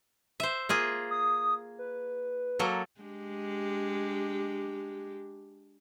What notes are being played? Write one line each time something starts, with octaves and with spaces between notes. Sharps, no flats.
C5 E5
A#3 F4 G#4
D#6
B4
F#3 A#3 A4
G#3 D4 G4